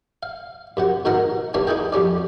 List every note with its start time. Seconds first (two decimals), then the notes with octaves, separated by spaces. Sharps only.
0.23 F5
0.77 F#2 C3 F#5
1.05 G#2 B2 D#3 A#4 F#5
1.54 G2 A#2 D3 A3 A#3 C#4
1.67 D#4 E4 G#4 G5
1.92 F2 G3 C#4 D5